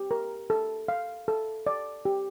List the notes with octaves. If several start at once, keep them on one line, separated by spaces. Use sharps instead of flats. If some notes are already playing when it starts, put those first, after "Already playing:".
Already playing: G4
A#4
A4
F5
A4
D5
G4